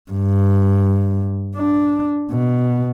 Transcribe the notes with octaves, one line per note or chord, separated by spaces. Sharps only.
G2
D4
B2